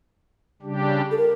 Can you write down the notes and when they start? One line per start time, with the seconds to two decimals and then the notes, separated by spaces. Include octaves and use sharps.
0.62 C#3 G3 D4 G4
1.11 A4
1.17 A#4